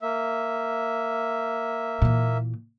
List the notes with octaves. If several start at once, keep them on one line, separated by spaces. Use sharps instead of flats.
A#3 E5
A#2 E3